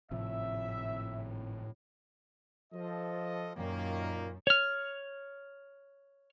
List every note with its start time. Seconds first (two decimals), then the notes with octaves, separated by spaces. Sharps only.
0.11 G#1 A2 C3 F3 E5
2.73 F3 A4 D#5
3.56 F#2 A#2 D#3 A#3
4.47 C#5 F6